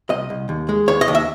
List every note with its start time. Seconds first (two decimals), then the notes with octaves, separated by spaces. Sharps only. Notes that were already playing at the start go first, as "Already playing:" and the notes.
0.10 C2 D#5
0.30 C2
0.49 D#2
0.69 G#3
0.88 D#2 C#5
1.01 D#5
1.08 D#2
1.15 E5